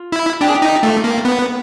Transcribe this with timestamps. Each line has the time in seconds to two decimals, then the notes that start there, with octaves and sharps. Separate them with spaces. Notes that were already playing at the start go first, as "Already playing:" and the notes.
Already playing: F4
0.12 E4
0.41 D4 G4
0.49 G#4
0.55 G4
0.62 D#4
0.83 A3 F4
1.04 A#3
1.25 B3